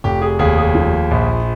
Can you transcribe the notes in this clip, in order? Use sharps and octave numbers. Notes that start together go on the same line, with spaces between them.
F1 G4
G#4
D#2 G#4
G#4
F3
A#1